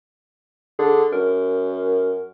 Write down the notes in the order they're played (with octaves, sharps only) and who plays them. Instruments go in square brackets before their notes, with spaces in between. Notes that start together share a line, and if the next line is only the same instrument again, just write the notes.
[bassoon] D3 [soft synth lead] G#4
[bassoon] F#2 [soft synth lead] A#4